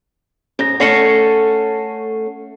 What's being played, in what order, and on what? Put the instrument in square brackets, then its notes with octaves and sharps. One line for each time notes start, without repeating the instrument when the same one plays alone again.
[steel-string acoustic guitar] G#2 [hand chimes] C#4 A#6
[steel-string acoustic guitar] A3 C#4 C#5 [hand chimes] F#5 C7 C#7